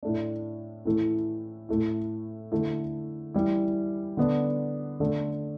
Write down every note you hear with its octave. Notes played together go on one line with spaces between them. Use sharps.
A2 A3 D4
A2 E3 A3 E4
A2 A3 E4
D3 A3 E4
E3 G3 E4
D3 B3 D4
D3 A3 D4